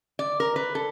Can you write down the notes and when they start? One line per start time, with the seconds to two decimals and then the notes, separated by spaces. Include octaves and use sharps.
0.19 D5
0.40 A#4
0.56 B4
0.75 A4